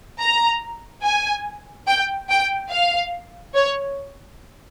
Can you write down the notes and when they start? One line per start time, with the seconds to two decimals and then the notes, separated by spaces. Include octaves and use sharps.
0.20 A#5
1.03 G#5
1.87 G5
2.29 G5
2.70 F5
3.55 C#5